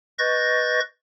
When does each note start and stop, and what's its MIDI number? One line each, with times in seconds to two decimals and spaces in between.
0.19 0.80 71
0.19 0.80 75
0.19 0.80 85
0.19 0.80 91
0.19 0.80 93
0.19 0.80 94